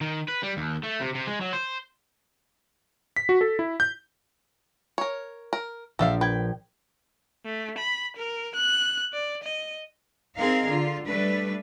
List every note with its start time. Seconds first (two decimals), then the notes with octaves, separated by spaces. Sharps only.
0.01 D#3
0.28 B4
0.43 G3
0.57 D#2
0.84 A3
1.01 C3
1.15 C3
1.28 G#3
1.41 F#3
1.53 C5
3.16 B6
3.29 F#4
3.41 A4
3.59 E4
3.80 G6
4.98 A#4 C#5
5.53 A#4
5.99 A#1 F3 A4 E5 F5
6.21 B4 G5 G#6
7.45 A3
7.78 B5
8.16 A#4
8.55 F#6
9.13 D5
9.43 D#5
10.38 C4 D#4 G#4 A#4 F5
10.67 D3 F4
11.05 G3 A3 D4 B4